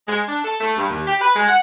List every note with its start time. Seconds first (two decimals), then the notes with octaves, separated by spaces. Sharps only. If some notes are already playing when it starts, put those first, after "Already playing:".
0.07 G#3
0.27 D4
0.44 A4
0.60 A3
0.77 G2
0.90 D#2
1.07 G4
1.21 B4
1.36 G#3
1.48 F#5